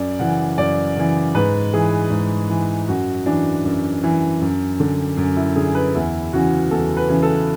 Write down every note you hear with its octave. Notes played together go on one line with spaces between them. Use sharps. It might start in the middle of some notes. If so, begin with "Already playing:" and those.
Already playing: F#2 D5
C#3 E3 F#5
F#2 D5
C#3 E3
G#2 B4
E3 G#4
G#2
E3
F#2 F#4
E3 D4
F#2
E3
F#2
D3
F#2
E4
D3 G#4
B4
E2 E4
C#3 E3 F#4
E2 A4
B4
C#3 E3
A4